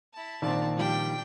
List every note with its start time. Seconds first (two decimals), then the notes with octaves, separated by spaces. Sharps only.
0.13 E4 A5
0.42 A#1 A#2 D#3 C4 D5 A5
0.77 F3 G3 D4 G5